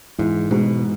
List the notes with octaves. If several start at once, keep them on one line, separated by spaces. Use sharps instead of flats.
G#2 E3
G#2 B2